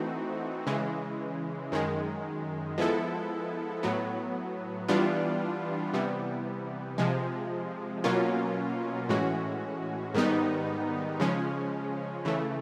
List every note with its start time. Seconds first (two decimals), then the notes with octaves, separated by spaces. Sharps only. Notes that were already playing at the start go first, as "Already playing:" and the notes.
Already playing: E3 A3 C4 D#4 F#4
0.67 C#3 E3 G#3
1.72 F#2 D#3 G#3
2.78 F3 G#3 B3 E4 A4
3.83 A2 F#3 B3
4.88 E3 G3 B3 D4 F4
5.93 C3 E3 G3 B3
6.98 C3 F3 G#3
8.04 B2 F#3 A#3 C#4 F4
9.09 A2 E3 G#3 C#4 F#4
10.14 G#2 D#3 G3 B3 D#4
11.20 C#3 F3 G#3 C#4
12.25 C#3 E3 A3